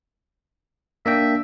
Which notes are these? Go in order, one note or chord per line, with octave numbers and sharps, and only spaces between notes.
A#3 D4 E5 G5